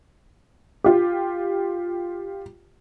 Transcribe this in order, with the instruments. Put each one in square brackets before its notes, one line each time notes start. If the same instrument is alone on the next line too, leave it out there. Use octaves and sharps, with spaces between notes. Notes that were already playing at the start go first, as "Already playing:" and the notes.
[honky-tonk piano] F4 G4